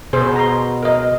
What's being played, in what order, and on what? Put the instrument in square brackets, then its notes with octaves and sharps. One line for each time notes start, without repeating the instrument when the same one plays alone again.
[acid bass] B2 [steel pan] G#4 C5
[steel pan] A#5 C6
A#4 D#5